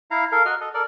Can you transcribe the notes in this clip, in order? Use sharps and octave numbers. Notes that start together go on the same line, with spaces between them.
E4 F5 A#5
A4 A#4 F5
F#4 D#5 F6
A4 D#5
A4 A#4 D5